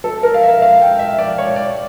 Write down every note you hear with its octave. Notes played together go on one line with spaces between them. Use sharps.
A4
A#4
F5
E5
F5
G5
E5
D5
C#5
D5